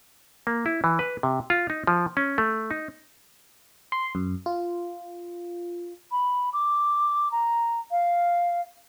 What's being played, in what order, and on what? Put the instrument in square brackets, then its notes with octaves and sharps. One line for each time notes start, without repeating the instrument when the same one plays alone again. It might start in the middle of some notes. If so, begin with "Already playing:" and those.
[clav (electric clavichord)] A#3
E4
E3
B4
C3
F4
D#4
F3
C#4
A3
D#4
[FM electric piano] C6
F#2
F4
[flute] B5
D6
A#5
F5